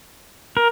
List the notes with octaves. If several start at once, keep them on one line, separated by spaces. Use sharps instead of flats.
A#4